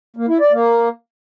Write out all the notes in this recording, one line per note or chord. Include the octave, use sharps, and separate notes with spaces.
A#3
E4
D5
A#3